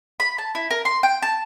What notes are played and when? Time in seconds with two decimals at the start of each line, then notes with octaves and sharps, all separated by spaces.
0.20 B5
0.38 A5
0.55 E4
0.71 A#4
0.85 C6
1.03 G5
1.22 A5